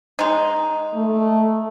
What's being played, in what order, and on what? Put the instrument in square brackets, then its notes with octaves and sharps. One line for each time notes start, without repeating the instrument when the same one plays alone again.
[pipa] G#3 D#4
[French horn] A3